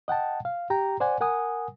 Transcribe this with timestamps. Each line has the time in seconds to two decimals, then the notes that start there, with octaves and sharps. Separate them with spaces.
0.08 D#5 F#5 G5 A5
0.45 F5
0.70 G4 G5 A#5
1.00 C5 D5 F#5 G#5
1.21 A#4 F#5 G#5 D#6